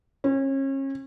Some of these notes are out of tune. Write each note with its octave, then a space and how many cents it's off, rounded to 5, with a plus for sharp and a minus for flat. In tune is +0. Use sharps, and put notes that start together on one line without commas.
C#4 -35